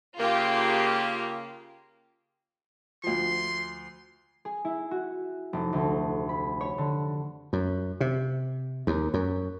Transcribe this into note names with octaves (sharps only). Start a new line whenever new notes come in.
C#3 A#3 F4 G4
D2 F3 C6
G#4
E4
F#4
F1
D2
B5
C#5
D3
F#2
C3
D#2
F#2